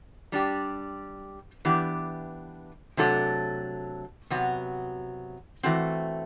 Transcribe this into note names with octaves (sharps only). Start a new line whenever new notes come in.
G3 D4 G4
E3 B3 D4 G4
C3 F#3 A3 D4 A4
C3 F#3 B3 F#4
E3 A3 C4 F#4